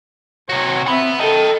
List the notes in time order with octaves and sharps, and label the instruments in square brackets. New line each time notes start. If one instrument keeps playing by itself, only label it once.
[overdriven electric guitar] C3 F#4 [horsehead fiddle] C#5
[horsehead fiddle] C4 E5 [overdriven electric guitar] F#5 B5
[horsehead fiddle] A4 [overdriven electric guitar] D#5 G5